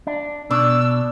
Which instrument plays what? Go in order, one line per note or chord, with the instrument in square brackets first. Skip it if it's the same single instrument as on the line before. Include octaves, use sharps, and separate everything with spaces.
[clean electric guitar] D4
[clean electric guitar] B2 [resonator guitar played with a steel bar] D4 [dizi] E6